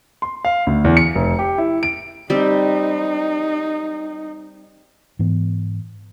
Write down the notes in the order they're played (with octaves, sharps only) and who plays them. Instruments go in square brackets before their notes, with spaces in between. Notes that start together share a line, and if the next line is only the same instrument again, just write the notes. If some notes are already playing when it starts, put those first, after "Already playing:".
[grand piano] C6
F5
D2
E2
C#7
F1
G4
E4
D7
[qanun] G3 C4 [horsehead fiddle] D#4
[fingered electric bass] G#2 E3 B3